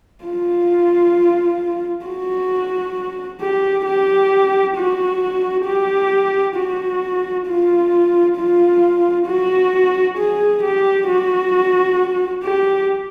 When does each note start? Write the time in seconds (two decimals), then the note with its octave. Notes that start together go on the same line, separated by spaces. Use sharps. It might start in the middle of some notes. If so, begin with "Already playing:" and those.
0.24 F4
2.06 F#4
3.41 G4
3.86 G4
4.76 F#4
5.66 G4
6.56 F#4
7.47 F4
8.37 F4
9.27 F#4
10.17 G#4
10.63 G4
11.09 F#4
12.43 G4